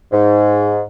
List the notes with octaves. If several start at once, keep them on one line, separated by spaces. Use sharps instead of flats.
G#2